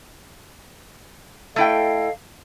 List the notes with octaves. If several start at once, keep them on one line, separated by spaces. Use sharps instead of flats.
A3 E4 A4 D#5 F5 G5